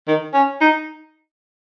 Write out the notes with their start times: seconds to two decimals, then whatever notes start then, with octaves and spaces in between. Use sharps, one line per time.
0.08 D#3
0.34 C#4
0.61 D#4